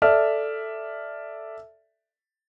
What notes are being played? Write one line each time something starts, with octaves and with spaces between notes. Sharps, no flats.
A4 D5 E5 F6